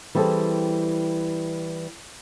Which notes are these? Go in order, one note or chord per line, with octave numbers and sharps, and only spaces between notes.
E3 G3 C4 G#4 A4